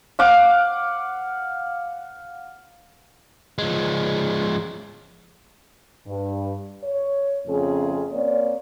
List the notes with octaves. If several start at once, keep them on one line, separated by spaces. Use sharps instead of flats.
F5 F#5 D6
F3 G#3
G2
C#5
F2 C#3 A3 C#4 G#4
A#3 C4 C#5 D5